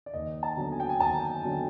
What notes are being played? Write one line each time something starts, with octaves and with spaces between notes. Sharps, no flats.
D5
D#2 D#5
A5
D3 F#3 B3
G#5
G5
G#5
D#2 A5
D3 F#3 B3